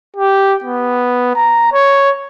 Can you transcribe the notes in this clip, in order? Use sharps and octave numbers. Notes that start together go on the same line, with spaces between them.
G4
B3
A#5
C#5